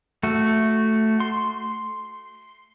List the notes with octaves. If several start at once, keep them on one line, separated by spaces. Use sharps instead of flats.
A3 F#4
C6